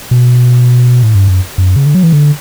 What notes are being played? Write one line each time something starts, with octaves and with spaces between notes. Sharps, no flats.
B2
A2
G2
F#2
F#2
C#3
D3
F#3
E3
D3